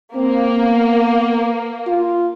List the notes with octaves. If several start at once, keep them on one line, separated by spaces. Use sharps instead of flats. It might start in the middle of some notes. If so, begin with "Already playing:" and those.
A#3 C4
B3
F4